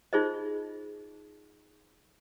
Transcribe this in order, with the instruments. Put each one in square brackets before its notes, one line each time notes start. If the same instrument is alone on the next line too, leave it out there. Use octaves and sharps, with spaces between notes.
[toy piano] D#4 F4 G#4 C5 D#5